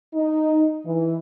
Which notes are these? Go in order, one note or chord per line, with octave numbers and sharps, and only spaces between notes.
D#4
E3